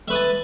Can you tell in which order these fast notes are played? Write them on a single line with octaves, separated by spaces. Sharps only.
E5 B4 D#6 A5